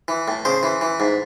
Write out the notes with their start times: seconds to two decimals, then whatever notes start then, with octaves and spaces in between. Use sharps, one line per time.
0.08 E3
0.28 A2
0.45 C#3 C5
0.63 E3
0.81 E3
1.00 G#2